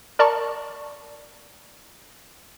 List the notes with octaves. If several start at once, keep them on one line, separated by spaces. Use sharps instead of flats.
A#4 D5 A5 A#5 C#6